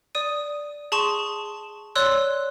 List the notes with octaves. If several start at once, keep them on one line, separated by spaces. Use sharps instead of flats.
D5 D#6 D#7
G#4 A5 C6 C#6 E7
C#5 D5 C6 E6 F#6